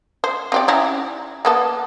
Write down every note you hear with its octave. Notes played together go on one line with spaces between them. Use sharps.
C5
C4 G4 D5
C#4 D#4 E4
A#3 B3 A4